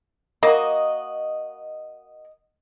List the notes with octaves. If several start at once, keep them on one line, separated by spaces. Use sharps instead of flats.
A#3 F#4 D#5